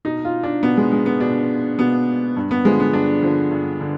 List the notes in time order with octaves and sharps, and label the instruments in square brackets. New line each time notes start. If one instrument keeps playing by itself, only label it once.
[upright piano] B2 D#4
F4
D4
B2 B3
G#3
G#3
B3
B2 D4
B2 B3
G2
B3
D3 F3 G#3
B3
G2 D4
D3 F3
G2
D3